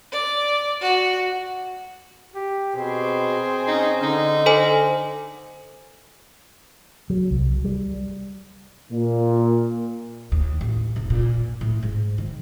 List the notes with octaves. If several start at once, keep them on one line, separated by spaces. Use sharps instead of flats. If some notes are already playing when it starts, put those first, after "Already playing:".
D5
F#4
G4
B2 C4 G#4
C#4 D#4
D3 D#4
A4 C5 G#5
F#3
C2
G3
A#2
D#2
A1
E1
A#2
A2
G#2
D#3